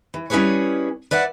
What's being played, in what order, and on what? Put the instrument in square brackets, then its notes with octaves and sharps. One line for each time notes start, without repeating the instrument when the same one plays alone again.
[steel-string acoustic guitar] E3
G3 C#4 E4 G#4 B4 C#5
B4 D5 E5 F#5